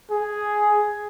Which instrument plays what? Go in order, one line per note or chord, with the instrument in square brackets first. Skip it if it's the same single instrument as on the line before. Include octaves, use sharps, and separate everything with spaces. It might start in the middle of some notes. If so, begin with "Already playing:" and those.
[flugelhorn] G#4